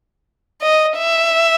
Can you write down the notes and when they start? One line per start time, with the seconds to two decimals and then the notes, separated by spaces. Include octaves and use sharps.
0.62 D#5
0.97 E5